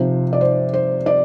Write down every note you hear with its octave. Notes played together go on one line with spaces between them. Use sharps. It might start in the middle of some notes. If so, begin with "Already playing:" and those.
Already playing: C3 F3 C4 D#4 C5
D5
C5
C5
D5